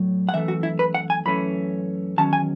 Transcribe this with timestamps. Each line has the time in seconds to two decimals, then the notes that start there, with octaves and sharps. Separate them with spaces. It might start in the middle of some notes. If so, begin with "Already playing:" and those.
Already playing: A2 F#3
0.29 F#5
0.33 F#2 E3 A3 E5
0.48 F#4
0.63 E4
0.79 B4
0.94 F#5
1.10 G#5
1.26 F#2 E3 A3 C#4 B5
2.18 E2 D#3 F#3 C#4 A5
2.33 G#5